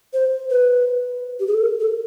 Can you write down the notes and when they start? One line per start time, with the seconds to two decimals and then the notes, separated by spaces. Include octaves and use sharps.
0.14 C5
0.50 B4
1.40 G4
1.47 G#4
1.54 A4
1.61 A#4
1.80 A4